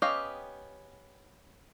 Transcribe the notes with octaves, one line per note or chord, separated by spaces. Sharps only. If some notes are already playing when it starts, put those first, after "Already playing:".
B3 C#4 G4 D#5 F5